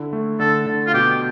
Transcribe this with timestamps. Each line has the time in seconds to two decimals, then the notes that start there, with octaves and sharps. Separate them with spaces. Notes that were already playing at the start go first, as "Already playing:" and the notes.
Already playing: D3 E4
0.13 A3
0.40 D3 A4
0.67 D3
0.87 F4
0.94 B2 G4